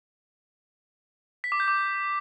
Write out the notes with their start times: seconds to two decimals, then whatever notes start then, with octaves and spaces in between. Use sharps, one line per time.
1.44 B6
1.52 D6
1.60 G6
1.68 D6